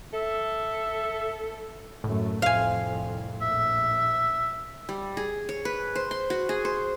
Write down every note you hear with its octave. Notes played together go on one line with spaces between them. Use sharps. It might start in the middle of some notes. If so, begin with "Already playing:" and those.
A4 E5
F#2 A2 A3
C2 F2 F5 G#5
A#1 E5
G3
G#4
C#5
B4
C5
C6
F#4
G#4
C5